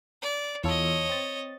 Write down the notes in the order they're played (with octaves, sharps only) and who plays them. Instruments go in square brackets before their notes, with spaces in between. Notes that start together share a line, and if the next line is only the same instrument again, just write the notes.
[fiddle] D5
[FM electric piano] E2 F4 A4 [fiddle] C#5 D#5
[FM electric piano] C4 A6